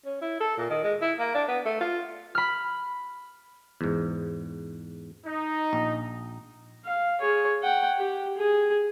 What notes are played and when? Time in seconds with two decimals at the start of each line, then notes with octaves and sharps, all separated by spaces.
0.05 C#4
0.22 E4
0.40 A4
0.57 A#2
0.70 D#3
0.83 G#3
1.01 E4
1.19 A#3
1.35 D4
1.48 B3
1.66 A3
1.81 F4
2.35 B5 F6
3.81 E2 G#2
5.26 D#4
5.73 A#1
6.85 F5
7.21 G#4 C#5
7.63 F#5 G5
7.98 G4
8.38 G#4